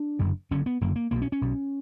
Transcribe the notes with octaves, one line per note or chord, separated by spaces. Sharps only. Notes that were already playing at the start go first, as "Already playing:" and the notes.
Already playing: D4
F#1 F#2 D3
F#1 F#2 D3 C#4
B3
F#1 F#2 D3 A#3
A#3
B1 B2 A#3
C#4
C#4
B1 B2